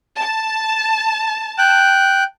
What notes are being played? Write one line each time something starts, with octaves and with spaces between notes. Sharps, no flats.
A5
G5 F#6